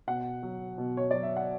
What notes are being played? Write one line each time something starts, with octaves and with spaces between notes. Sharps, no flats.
B2 F#5
F#3
B2
C#5
F#3 D5
E5
F#5